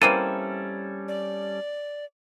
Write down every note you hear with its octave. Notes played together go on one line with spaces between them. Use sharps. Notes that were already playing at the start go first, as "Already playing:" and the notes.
E3 G3 A#3 C4 C#4 A4 D#7
D5